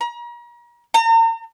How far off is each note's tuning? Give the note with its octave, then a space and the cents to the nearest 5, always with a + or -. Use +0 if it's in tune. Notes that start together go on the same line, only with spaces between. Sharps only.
A#5 +40
A#5 -40